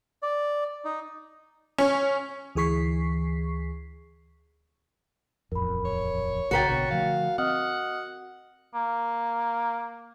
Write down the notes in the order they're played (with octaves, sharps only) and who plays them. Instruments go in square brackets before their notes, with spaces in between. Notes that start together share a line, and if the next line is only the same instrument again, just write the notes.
[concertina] D5
D#4
[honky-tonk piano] C#4
[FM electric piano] D2 E3 G#4 C#6 B6 C7
[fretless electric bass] D#1 A1 F2 [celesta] A#4 B5
[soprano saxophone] C#5
[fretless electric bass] B1 C#3 [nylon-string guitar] F#4 A#4 G5 [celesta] A6 B6 C#7
[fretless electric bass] A#1 B2 D3 [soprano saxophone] C#5
[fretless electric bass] D3 F3 A3 [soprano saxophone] F5
[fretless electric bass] C4 [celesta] D#5 D#6 F6 [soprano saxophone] F#5
[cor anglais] A#3